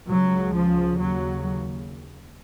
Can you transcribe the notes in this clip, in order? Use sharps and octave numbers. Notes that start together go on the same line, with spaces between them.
C#2 C#3 F#3
F3
D#2 C#3 F#3